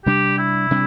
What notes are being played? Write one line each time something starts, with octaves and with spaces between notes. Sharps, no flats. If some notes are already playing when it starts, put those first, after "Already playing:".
C3 G3 D4 G4
E4
C3 G3 D4